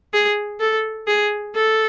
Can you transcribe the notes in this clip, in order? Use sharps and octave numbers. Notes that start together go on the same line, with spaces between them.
G#4
A4
G#4
A4